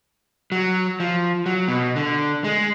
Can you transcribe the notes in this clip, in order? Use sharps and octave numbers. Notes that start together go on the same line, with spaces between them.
F#3
F3
F#3
B2
D3
G#3